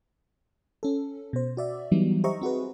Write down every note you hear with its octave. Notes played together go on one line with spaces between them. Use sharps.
C#4 A4
B2 C5
F#4 D5 E5
E3 F#3 G3 B3 D#4
G4 C5 D#5 E5 A#5 C#6
C4 F#4 G#4 B4